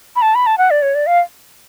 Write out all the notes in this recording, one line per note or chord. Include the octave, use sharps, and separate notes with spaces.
B5
A5
B5
A5
F#5
D5
C#5
D5
F5